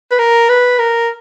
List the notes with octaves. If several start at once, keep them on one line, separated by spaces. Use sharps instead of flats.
B4
A#4
B4
A#4